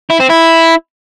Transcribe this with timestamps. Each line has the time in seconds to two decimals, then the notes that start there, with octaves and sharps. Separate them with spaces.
0.10 E4
0.20 C4
0.29 E4